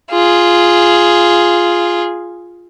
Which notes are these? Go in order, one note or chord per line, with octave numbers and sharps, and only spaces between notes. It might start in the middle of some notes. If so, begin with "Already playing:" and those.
F4 G#4